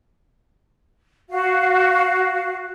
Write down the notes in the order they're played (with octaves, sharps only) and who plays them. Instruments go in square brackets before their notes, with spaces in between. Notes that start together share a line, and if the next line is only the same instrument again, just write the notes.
[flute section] F#4 F5